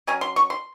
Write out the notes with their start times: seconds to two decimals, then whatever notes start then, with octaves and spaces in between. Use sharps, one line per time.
0.07 F#3 C#4 G#5
0.21 C6
0.36 C#6
0.50 C6